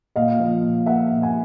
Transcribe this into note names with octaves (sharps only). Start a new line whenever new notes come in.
A#2 D#5 F5
F3
A#2
A#3 E5 F#5
A#2
F#5 G#5